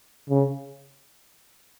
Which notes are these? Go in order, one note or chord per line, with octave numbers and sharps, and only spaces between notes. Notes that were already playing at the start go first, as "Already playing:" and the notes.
C#3